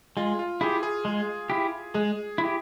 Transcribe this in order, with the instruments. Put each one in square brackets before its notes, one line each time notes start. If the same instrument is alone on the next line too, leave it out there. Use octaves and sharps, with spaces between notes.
[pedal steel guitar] G#3 [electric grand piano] F4
[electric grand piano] F4
[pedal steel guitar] E4 G4 [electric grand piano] G#4
[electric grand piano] G#4
[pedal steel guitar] G#3
E4 G4
[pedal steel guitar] G#3 [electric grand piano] G#4
[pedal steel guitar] E4
G4